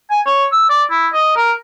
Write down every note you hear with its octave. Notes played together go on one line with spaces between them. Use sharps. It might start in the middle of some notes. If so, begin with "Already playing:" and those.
G#5
C#5
E6
D5
E4
D#5
A#4